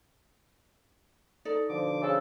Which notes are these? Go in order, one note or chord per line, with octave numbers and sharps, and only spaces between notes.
D#4 A4 D5
B2 D3 F3 D6
C#3 A4